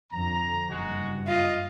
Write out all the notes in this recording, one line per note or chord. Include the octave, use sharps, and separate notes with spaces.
F2 D3 A#5
F#1 G2 G#3 F#4
F4 D#5